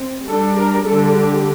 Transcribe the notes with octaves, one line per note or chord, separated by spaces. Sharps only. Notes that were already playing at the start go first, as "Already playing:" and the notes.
Already playing: C4
G3 D4 A4
A#4
D3 G3 D4 A4
G4